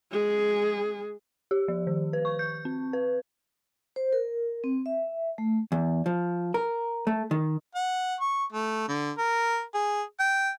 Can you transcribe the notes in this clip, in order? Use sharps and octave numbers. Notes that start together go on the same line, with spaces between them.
G#3 G#4
G4
F3
D#3
B4
C#6
G6
C4
B4
C5
A#4
C4
E5
A3
E2
F3
A#4
A3
D#3
F#5
C#6
A3
D3
A#4
G#4
G5